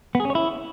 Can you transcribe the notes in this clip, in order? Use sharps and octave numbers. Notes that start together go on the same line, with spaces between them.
B3
G#4
C#4
C#5
E4